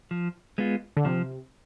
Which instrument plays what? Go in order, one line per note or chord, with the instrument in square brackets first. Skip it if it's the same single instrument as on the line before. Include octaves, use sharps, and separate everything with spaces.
[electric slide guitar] F3
G#3 B3 F4
[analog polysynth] D3
[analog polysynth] C3 [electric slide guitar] F3